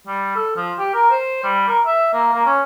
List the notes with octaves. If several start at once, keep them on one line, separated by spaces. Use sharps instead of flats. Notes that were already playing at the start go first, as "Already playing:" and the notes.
G3
A4
F3
G4
A#4
C5
G3
A#4
E5
A#3
A#3
C#4